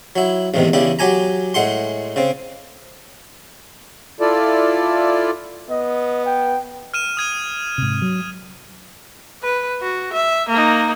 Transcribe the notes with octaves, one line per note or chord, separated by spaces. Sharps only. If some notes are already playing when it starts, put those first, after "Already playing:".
F#3 E4
A1 E2 G#2 C3 D#3
E2 C#3 D4 E4 G4
F#3 G4 G#5 A#5
A2 G#3 F#5 C6
C#3 C4
E4 F4 A4 D5
B3 D#5
G5
F6 D#7 E7
D#6 G#6 D#7
G#2 C3
F#3
B4
F#4
E5
A#3 D#4